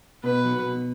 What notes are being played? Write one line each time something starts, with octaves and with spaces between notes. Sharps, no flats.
B2 B4
F#3
B2